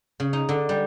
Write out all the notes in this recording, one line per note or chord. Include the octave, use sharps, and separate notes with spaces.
C#3
D#4
D3
G3